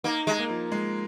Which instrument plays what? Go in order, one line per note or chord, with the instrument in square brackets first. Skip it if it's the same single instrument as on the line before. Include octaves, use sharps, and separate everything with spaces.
[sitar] A#3 [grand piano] D#4
[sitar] G#3
[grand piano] A#3
F3
G#3